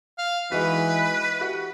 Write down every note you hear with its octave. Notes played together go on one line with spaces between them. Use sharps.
F5
E3 G#3 D#4 F#4 B4
F#4 G4